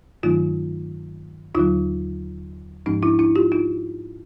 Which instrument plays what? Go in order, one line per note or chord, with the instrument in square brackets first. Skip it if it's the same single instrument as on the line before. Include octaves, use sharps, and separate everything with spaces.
[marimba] G2 D#3 F#3 A3 D#4 F4
D#2 D3 F#3 D#4 F4
G#2 F3 G#3 C#4 D#4
D4 E4
D4 E4
F4 G4
D#4 F4